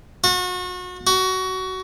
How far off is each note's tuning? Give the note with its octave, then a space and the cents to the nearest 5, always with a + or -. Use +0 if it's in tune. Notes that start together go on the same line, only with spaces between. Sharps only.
F#4 -35
F#4 +20